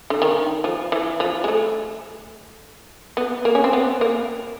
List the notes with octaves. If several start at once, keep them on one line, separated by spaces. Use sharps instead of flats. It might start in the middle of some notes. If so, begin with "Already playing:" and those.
D3
D#3
F3
E3
F3
G#3
A3
B3
A#3
C#4
C4
B3
A#3